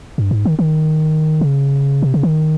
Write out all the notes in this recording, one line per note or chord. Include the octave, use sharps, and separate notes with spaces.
G2
G#2
D#3
D#3
C#3
C3
C#3
D#3